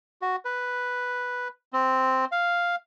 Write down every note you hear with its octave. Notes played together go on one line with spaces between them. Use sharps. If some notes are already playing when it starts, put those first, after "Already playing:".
F#4
B4
C4
F5